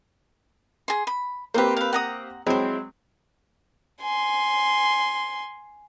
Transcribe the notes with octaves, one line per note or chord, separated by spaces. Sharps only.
G#4 C6
B5
A#3 C4 G4 B4 C5
B4 F5
F#5 A#5 D#6
F#3 G#3 C4 E4 C5
G#5 C6